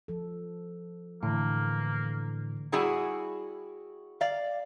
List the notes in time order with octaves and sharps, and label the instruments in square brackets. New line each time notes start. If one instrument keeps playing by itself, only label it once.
[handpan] F3 A4
[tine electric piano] A2 [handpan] D3 E3 [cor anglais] A#3
[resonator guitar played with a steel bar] G3 E4 F#4 G#4 G#5
D5 F5